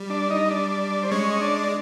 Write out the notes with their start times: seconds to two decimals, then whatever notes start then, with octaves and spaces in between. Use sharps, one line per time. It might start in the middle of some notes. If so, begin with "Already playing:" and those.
Already playing: G3
0.10 D4 D5
0.30 D#4 D#5
0.50 D4 D5
1.03 C5
1.11 G#3 C#4 C#5
1.30 D#5
1.41 D4 D5